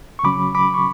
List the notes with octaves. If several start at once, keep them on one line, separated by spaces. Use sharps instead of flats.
C#6
C#3 F#3 C#4 B5 D6
B5 D6
C#6